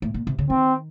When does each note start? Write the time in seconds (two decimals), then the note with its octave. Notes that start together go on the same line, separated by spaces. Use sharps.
0.02 A2
0.14 A#2
0.27 C3
0.38 C#3
0.50 D#3 C4